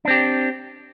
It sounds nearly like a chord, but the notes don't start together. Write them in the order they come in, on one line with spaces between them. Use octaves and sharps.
D4 C4 G4